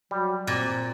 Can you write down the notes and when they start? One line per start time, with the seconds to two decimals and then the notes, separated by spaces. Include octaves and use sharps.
0.11 F#3 G3
0.47 A#2 C4